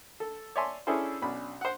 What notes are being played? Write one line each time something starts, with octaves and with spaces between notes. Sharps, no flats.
A4
C#5 D5 E5 G#5 A5 C6
C#4 D4 E4 G#4 A4 C5
B1 C#4 D4 B5
C5 F#5